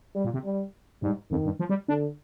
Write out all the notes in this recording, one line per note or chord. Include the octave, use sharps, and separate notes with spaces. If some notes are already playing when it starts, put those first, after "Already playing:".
G3
A#2
C3
G3
G#2 G3
F2 D#3
G2
F3
G3
D3 D4